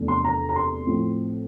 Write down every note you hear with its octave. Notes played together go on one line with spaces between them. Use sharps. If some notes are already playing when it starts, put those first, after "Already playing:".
Already playing: E2 C3 F3 A3 D4
C6
A#5
A#5
C6
A2 F3 C4